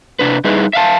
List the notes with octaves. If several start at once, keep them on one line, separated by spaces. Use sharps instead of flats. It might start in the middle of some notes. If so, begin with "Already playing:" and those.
C3 D4 B4
G3 D#4 E4 G#4 B4
E5 F5 A5